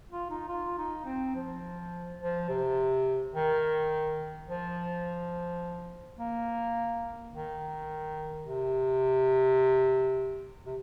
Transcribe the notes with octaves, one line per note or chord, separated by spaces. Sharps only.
F4
D#4
F4
D#4
C4
F3
F3
C3
D#3
F3
A#3
D#3
C3
C3